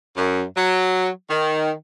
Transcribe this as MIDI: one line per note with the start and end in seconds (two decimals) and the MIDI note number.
0.17 0.41 42
0.56 1.08 54
1.30 1.70 51